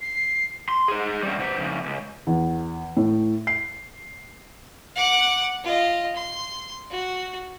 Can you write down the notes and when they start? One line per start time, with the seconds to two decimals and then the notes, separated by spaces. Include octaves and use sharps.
0.01 C7
0.69 C6
0.88 G#4 C5
1.23 G3 C#4
1.39 B2 C5
1.58 F2 C#3
1.86 C#2
2.27 E2
2.97 A2
3.47 C7
4.96 F#5 D6
5.64 F4 D#5
6.15 C6
6.90 F#4